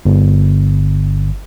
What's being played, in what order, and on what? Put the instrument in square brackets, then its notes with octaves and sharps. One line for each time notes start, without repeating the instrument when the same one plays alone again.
[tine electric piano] G1